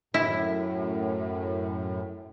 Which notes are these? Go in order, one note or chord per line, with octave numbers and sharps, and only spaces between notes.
F#2 A2 E4